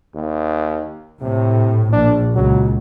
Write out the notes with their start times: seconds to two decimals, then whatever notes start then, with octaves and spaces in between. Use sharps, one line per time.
0.15 D#2
1.21 A2 C3
1.92 A#1 D4
2.34 C#2 F#3